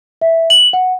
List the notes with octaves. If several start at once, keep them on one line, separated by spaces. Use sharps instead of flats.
E5
F#7
F#5